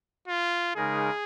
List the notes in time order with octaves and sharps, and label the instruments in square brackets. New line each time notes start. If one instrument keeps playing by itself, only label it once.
[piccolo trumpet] F4
[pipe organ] C#3 G#3 D#4 A#4 [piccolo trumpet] G#4